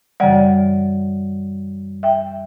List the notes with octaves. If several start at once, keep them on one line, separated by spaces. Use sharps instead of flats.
F#2 C#3 E3 G3 D5 F#5
E5 G5